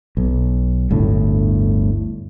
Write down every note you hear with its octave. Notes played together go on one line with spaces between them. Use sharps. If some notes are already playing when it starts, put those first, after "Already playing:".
B1
G1 D2 A2